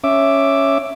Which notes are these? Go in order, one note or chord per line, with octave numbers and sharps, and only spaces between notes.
C#4 E5 D6